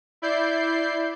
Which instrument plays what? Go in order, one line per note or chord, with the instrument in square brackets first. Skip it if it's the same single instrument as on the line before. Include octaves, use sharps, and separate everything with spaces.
[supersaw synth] E4 D5 G6 C7